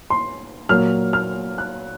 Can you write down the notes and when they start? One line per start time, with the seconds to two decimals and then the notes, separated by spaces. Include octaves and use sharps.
0.10 C6
0.69 A#2 F#3 A#3 F6
1.13 F6
1.58 F#6